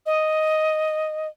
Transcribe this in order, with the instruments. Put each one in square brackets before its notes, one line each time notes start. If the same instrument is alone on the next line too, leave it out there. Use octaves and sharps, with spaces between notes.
[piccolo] D#5